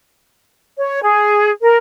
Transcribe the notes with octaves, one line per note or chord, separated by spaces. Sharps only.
C#5
G#4
A#4